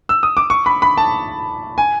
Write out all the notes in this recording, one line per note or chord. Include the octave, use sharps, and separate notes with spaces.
E6
D#6
D6
C#6
B5
B5
A5
G#5